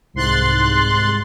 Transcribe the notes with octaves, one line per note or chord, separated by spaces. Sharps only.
C2 G#2 C6 F#6 A6